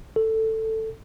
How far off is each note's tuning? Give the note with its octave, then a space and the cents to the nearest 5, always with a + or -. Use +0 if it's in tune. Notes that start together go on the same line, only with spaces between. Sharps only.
A4 +10